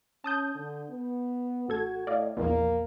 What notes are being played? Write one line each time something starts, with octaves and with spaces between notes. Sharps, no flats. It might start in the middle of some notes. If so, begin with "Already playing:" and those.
C#4 A5 D#6 G6
D3
B3
A1 F#4 A4 G#6
A2 D5 D#5 F5
A#1 E2 A#3